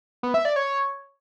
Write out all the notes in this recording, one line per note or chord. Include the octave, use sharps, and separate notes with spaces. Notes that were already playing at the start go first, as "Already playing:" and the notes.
B3
E5
D5
C#5